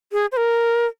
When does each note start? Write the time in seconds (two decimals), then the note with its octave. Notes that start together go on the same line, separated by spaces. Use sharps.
0.12 G#4
0.32 C5
0.37 A#4